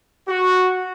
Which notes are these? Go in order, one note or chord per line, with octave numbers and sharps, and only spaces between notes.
F#4